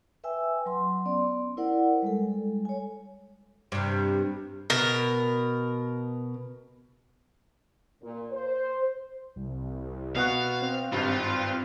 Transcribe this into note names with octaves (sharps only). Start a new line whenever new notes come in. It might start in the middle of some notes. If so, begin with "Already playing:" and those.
B4 E5 G5 G#5 E6
F#3 C6
B3 C#4 D5 C6
E4 A#4 C5 D5 F#5
G3 G#3 A4
C#5 G#5
G2 C3
B2 A#4
A#2
C5
C2
B2 B3 F#4 F5
C4
G#1 G2 C4 F4